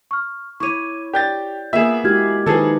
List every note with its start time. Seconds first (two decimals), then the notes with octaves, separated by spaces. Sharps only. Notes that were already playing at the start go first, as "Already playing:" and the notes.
0.11 C#6 F6
0.60 E4 C#5 C#6 D6 D#7
1.14 G4 D5 G5 G6 A6
1.73 A#3 B3 F4 G#4 E5 E7
2.04 G#3 E4 F#4 G4 F6 G#6
2.46 D#3 F3 D#4 G#4 A4 B4